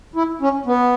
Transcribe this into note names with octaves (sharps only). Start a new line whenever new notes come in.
E4
C#4
B3